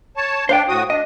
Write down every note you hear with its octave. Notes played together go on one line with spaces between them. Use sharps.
C#5 A5
D4 C5 F5 G5
A2 F#4 D#6
D4 D#5